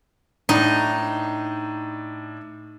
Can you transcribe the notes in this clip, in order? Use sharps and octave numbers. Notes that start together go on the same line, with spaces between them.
A2 D4 D#4